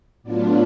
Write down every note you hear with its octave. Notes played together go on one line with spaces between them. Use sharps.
A2 F#3 B3 D4 F4 D5